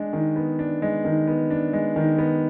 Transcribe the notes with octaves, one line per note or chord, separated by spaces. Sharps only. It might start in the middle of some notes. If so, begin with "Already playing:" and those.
Already playing: G#3 D4
D#3
B3
D4
G#3
D#3
B3
D4
G#3
D#3
B3